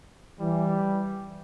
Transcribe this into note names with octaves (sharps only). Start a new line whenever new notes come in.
E3 G3